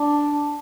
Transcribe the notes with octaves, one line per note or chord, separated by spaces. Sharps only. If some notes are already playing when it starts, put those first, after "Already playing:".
Already playing: D4